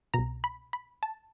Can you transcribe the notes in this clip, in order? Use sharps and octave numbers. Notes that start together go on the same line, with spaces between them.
C2 B2 A#5
B5
B5
A5